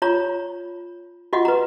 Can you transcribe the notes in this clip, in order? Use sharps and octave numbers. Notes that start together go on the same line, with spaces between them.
F4 C#5 A#5
F4 F#4 D#5 F#5
B4 A#5